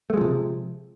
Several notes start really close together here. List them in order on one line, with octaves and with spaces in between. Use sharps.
A3 G#3 F3 C3